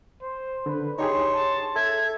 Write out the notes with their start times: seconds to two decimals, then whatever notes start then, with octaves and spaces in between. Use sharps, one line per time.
0.22 C5
0.66 D3 B4
0.98 D#4 G4 G#4 C#5 C6
1.33 A5
1.76 A4 E5 G#6